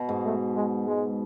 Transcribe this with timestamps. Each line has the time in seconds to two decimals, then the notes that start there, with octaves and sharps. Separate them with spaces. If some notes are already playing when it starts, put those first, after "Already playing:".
Already playing: B2
0.09 G#2
0.25 A3
0.55 G#3
0.87 G#3